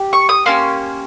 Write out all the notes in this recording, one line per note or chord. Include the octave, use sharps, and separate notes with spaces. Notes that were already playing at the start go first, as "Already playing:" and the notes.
Already playing: G4
C#6
D#6
A#3 C#4 G4 C6